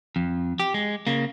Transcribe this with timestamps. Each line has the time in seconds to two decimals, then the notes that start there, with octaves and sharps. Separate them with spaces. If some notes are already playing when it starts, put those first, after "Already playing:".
0.16 F2
0.60 G4
0.74 G#3
1.07 C#3 A#3